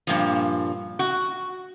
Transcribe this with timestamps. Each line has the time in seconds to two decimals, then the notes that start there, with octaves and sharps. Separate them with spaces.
0.07 G2 A#2 F3
0.99 F#4